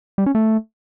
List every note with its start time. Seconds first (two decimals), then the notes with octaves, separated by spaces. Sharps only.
0.18 G3
0.26 C#4
0.35 A3